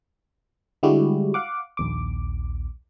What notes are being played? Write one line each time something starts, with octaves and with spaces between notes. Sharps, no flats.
D3 G3 G#3 E4 F#4 G4
F5 F#5 D6
A#1 D#2 D6